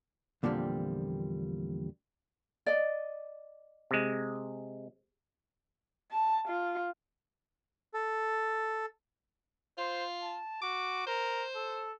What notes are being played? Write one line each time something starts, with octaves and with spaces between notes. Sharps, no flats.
E2 A#2 D3 F3 G3 C4
D5 D#5
C3 G#3
A5
F4
A4
F4 C5
A5
F#4 D6
A#4 C5
A4